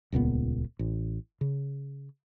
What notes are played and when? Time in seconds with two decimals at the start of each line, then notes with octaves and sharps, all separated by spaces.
0.12 D#1 C#2 A#2 B3
0.79 A1
1.41 C#3